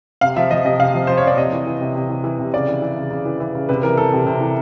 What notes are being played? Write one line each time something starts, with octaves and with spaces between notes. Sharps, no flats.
C3 F5
F3 E5
F3 D#5
C3 D#5
C3 F5
F3
F3 C5
C#5
C3 D5
C3 D#5
E3
E3
C3
C3
E3
E3
C3
C#3 D5
E3
E3
C#3
C#3
E3
E3
C#3
C3 B4
E3 A#4
E3 A4
C3
C3
E3